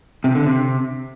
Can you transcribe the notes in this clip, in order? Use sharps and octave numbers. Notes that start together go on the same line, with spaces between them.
C3
D3
C3